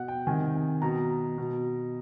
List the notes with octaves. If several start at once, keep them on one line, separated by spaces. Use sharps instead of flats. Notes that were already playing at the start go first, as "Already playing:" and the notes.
Already playing: B2 F#5
G5
C3 D#3 G#5
B2 A#5
B2